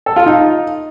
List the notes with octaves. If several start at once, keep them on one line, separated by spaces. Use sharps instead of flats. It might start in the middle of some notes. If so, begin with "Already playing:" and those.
A4
F4
D#4